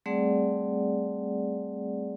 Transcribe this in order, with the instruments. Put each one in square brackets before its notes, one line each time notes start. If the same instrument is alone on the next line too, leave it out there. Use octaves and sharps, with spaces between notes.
[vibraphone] G3 A3 C4 G#4 D5 F#5